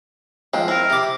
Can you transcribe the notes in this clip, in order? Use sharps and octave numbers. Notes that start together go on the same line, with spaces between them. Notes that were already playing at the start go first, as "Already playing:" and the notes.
F3 G#3 C4
C4 E4 A#4
C3 D6